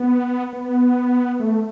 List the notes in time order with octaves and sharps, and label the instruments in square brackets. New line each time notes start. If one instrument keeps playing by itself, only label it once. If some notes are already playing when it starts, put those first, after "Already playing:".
Already playing: [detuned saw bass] B3
B3
A3